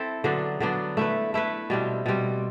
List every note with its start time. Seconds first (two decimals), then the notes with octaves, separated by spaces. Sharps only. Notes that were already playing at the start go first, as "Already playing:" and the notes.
Already playing: C4 E4 A4
0.24 D3 F#3 B3 D4
0.60 D3 F#3 B3 D4
0.97 A3 E4 B4
1.34 A3 E4 B4
1.70 B2 G3 C4
2.06 B2 G3 C4